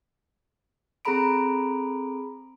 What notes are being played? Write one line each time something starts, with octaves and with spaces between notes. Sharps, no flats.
C4 G#4 A4 A#5 B5 D7